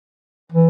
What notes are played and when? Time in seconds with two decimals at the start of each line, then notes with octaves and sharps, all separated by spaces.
0.52 E3